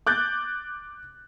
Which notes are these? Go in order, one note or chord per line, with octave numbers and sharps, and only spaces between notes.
D6 F#6 G6 A6